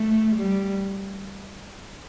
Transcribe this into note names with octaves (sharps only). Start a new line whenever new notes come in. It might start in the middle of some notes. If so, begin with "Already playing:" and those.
Already playing: A3
G3